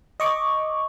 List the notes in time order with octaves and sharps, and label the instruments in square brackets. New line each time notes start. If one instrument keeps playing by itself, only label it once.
[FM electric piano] D#5 C#6 D6